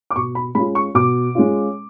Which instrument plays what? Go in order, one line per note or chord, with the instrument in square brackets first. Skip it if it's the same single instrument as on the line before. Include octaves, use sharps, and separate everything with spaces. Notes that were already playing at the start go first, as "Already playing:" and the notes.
[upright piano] D6
B2 C#6
B5
G#3 C#4 F4 B5
C#6
B2 D6
G#3 C#4 F4